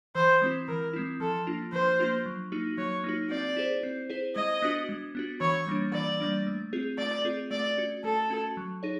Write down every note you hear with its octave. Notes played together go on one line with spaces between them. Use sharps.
E3 C5
G#3 C4 E4
E3 A#4
G#3 C4 E4
F3 A4
A#3 D4 F4
F3 C5
A#3 D4 F4
F#3
A#3 D#4 F#4
F#3 C#5
A#3 D#4 F#4
C4 D5
E4 G#4 C5
C4
E4 G#4 C5
G#3 D#5
B3 D4 F#4
G#3
B3 D4 F#4
E3 C#5
G3 A#3 D4
E3 D5
G3 A#3 D4
A3
C4 F4 G#4
A3 D5
C4 F4 G#4
A3 D5
C#4 F#4
A3 A4
C#4 F#4
F#3
D#4 G#4 C#5